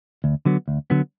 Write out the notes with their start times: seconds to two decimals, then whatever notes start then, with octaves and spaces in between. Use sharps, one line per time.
0.24 D2
0.45 D3 F#3 B3
0.68 D2
0.90 D3 F#3 B3